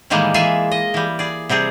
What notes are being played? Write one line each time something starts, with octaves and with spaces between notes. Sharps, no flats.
A2 D#3 E3 G3 G#3 A#3
E3 F4 G#4 E5 G#5
D#5
E3 G3
G#4 D5
C3 G3 C4 G#4